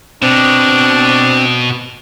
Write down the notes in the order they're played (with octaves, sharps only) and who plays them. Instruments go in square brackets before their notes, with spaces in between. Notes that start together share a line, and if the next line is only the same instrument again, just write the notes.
[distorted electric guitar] B2 [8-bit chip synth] C4 [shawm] D4